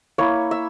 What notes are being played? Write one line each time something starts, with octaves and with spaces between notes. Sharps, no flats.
A#3 E4 C#5
E5